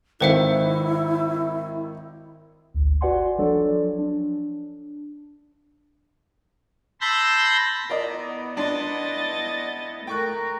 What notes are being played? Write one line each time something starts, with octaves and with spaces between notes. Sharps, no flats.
G#1 D#3 E4 B4 C5 E5 C#7
G#1 D2
F#4 B4 D5 F#5 G#5 C6
F3 F#3 D4 A4 C#5 D5
D4
A5 B5 C6 E6 G6 A#6
B3 E4 A#4 D5 D#5
D4 D#5 C6 A6
A3 A#4 G5 C#6 F#6